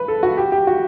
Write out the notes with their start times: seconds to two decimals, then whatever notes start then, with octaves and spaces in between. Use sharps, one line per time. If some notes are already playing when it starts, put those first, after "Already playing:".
Already playing: B4
0.08 A4
0.23 F#4
0.37 G4
0.52 G4
0.67 F#4